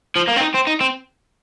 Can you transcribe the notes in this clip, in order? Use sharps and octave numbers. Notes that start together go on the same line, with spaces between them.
F3
A#3
C4
D#4
C4
D#4
C4